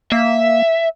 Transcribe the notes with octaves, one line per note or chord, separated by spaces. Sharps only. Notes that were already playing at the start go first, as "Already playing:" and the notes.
A#3 E5